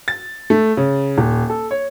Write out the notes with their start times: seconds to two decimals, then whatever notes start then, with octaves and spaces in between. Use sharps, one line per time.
0.08 A6
0.50 A3
0.77 C#3
1.18 D#1
1.50 A4
1.71 C#5